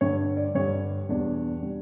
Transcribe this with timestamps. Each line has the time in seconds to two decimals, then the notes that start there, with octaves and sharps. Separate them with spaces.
0.01 G2 D3 G3 C#5
0.37 D5
0.55 G2 D3 G3 C#5
1.09 E2 B2 G3 D4
1.62 B2 G3 D4